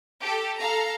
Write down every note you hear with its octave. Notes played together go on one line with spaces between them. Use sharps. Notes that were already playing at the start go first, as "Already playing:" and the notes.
G4 A4
A4 F5 A#5